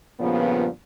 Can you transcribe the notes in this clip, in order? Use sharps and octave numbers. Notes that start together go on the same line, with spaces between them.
G2 A#2 C#3 F3 B3